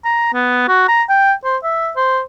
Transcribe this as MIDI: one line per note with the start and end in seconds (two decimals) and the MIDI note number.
0.05 0.30 82
0.33 0.67 59
0.68 0.84 66
0.88 1.03 82
1.09 1.33 79
1.44 1.57 72
1.63 1.90 76
1.96 2.20 72